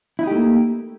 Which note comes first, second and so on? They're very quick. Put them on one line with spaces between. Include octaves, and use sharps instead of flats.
E4 D#4 G4 A3 A#3